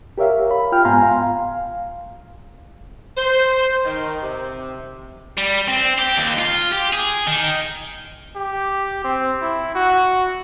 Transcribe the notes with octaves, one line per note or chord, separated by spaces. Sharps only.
G4 A#4 C#5 E5 F5
B5
F4 G5 F6
G#2 B3 F5 G#5 A#5 C6
F5
C5
D#3
C3
G3
C4
G4
D#2
F4
G4
G#4
D#3
G4
C4
E4
F#4